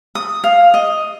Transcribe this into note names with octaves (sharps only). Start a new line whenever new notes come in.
D#6
F5
D#5